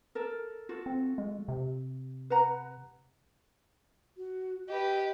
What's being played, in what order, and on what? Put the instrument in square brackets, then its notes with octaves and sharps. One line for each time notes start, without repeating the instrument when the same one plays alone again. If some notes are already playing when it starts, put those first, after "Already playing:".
[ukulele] A4 A#4
F4 F#4 A4
[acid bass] C4
G#3
C3
[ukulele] B4 F#5 A#5
[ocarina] F#4
[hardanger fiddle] G4 B4 [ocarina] D#5